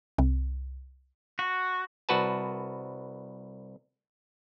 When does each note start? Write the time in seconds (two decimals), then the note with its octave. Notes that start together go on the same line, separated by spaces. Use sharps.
0.18 C2
1.39 F#4
2.09 C2 F#4 B4 A5